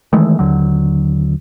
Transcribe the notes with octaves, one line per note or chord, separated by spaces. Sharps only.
D#3 E3 G#3 A3
D#2 D3 F#3